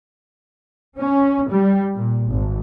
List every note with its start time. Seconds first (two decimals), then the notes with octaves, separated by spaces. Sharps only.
0.98 C#4
1.49 G3
1.95 A#2
2.31 G#1